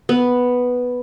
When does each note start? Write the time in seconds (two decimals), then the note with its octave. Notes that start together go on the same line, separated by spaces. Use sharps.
0.09 B3